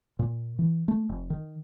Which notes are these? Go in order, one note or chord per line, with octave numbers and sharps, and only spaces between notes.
A#2
E3
A3
F1
D#3